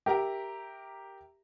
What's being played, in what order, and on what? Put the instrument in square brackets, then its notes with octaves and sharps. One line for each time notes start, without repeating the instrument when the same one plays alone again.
[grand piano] G4 A#4 E5 A#5